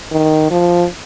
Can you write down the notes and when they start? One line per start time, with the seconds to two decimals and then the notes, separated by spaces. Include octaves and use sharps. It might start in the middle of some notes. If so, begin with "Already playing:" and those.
0.11 D#3
0.51 F3